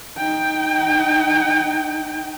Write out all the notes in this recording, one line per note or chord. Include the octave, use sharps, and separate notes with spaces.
D#4 G5